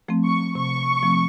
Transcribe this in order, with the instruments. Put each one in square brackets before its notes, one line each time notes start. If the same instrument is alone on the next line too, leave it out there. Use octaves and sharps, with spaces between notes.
[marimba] F3 A3 C4
[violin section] C#6
[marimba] C3 [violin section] C#6
[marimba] F3 A3 C4